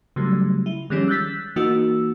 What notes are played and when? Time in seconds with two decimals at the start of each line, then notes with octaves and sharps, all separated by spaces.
0.16 C#3 F#3 G3 A3
0.66 E4
0.90 D#3 F3 G3 G#3 C#4
1.08 E6 F#6 G6 A6 B6
1.56 E3 A#3 D#4 F#4 E6